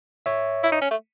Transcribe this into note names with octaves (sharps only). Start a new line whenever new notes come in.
C#5 E5
E4
D#4
C#4
A3